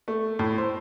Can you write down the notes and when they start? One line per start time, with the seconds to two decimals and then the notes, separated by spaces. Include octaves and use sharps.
0.08 A3
0.39 A2
0.58 C5